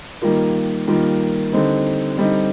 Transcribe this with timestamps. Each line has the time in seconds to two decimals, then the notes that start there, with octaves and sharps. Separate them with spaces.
0.22 D#3 G3 A#3 F4 A#4
0.87 D#3 G3 A#3 F4 A#4
1.52 D3 G3 C4 D#4
2.17 D3 G3 C4 D#4